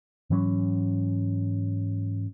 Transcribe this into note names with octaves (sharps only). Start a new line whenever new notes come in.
G#2 E3 F#3 C#4